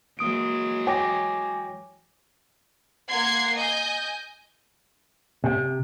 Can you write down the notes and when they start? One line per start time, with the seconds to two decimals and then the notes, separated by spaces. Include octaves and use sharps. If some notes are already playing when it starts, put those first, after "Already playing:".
0.19 E3 F#3 G#3 A#3 D#6 D7
0.87 C#5 G5 G#5 D6 A#6
3.08 A#3 F#5 C6 G#6 C7
3.55 D#5 G#5 G6
5.44 C3